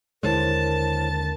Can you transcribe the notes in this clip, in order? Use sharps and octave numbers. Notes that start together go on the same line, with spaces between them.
D#2 D3 G#3 E4 A#4 C5 C#5 A5